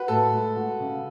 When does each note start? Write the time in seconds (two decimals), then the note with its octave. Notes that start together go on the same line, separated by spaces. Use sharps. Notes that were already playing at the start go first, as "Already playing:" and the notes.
Already playing: F#4 B4
0.08 A2 A4
0.33 G#3
0.57 F#4
0.80 C#3